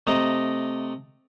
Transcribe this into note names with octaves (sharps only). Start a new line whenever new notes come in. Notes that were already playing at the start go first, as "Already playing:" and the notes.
C3 A3 D#5 A#5